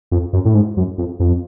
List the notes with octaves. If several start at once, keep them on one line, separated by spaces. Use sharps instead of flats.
F2
F#2
A2
G#2
F#2
F2
F2